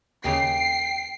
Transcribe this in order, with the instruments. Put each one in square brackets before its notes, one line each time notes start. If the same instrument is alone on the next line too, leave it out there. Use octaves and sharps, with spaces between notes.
[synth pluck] D#2 C#3 [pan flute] G5 [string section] C7